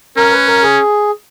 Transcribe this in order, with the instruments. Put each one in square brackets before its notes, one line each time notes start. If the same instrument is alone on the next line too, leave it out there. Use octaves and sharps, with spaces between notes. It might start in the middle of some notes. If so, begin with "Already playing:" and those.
[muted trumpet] C#4 [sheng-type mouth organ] A#4
[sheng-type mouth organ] B4
A#4
G#4